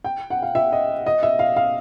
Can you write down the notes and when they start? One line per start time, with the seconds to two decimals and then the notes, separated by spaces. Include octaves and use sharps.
0.04 G5
0.30 F#5
0.42 F5
0.55 E5
0.72 D#5
1.06 D#5
1.23 E5
1.39 F5
1.56 F5